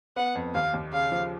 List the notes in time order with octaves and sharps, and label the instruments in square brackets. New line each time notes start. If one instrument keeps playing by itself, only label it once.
[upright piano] B3 [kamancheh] F#5
[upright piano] F2
[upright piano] D#2 [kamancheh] F5
[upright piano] D#2
[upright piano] C#3 [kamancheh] F5
[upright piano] F3